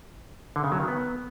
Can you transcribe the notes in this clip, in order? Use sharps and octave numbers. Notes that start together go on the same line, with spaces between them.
D3
C#3
F#3
D#3
B3